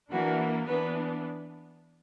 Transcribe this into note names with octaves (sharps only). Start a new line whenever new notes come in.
E3 A#3 D4 F#4 A#4
E3 B3 D4 B4